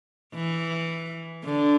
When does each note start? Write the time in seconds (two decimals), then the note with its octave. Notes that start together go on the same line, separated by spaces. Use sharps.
0.35 E3
1.44 D3